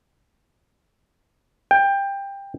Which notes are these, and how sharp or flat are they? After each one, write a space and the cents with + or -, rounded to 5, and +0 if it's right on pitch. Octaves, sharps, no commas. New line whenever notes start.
G5 +20